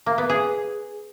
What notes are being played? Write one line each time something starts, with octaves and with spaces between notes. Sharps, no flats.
A#3
B3
G#4